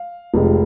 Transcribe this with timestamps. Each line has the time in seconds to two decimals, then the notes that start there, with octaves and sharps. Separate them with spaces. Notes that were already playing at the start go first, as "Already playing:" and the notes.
Already playing: F5
0.34 F1 F2 C3 G#3